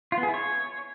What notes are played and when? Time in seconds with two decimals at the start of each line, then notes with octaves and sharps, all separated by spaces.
0.12 F4
0.18 B3
0.23 G#4
0.28 E4
0.34 C#5